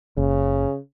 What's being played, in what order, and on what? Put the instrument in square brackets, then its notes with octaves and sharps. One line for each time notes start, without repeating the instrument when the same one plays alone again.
[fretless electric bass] F#1 [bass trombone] C#3